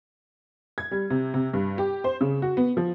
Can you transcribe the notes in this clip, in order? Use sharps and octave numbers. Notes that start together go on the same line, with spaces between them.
G#6
G3
C3
C3
G2
G4
C5
C#3
F#4
B3
F3